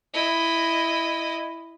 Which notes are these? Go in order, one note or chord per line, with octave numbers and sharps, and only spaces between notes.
E4 D#5